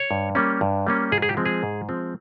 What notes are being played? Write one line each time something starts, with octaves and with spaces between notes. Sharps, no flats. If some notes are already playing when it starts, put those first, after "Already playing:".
Already playing: C#5
G2
G3 A#3 C#4
G2
G3 A#3 C#4
G#2 G#4
G#4
G4
F3 G#3 C4
G#4
G#2
F3 G#3 C4